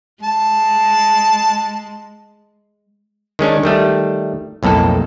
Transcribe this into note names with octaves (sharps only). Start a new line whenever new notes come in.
G#3 A5
D#3 G#3 C#4 D4
D#3 G3 A3
B1 F2 A2 A#3 A4